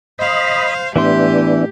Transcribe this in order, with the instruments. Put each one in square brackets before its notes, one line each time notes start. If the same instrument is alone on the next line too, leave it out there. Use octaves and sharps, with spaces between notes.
[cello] C5 F5 [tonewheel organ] D#5 B5
[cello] A2 G4 [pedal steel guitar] E3 E5 C6 [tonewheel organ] B3 D4